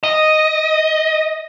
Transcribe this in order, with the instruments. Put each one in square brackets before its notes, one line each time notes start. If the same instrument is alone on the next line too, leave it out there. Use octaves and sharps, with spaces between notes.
[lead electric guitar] D#5